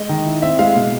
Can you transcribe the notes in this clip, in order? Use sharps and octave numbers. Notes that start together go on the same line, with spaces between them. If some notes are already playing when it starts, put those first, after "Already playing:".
Already playing: G#3 D#5
D#3
E4
C4 E5
G#3 F5
B2